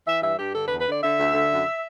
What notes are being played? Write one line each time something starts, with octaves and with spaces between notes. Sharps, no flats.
E3 E5
G2 E5
G2 G4
D3 A4
B4
E2
B4
D3 D5
D3 E5
D2
D3
F#2